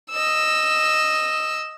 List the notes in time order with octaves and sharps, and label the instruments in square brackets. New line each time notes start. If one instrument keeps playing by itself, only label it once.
[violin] D#5 E6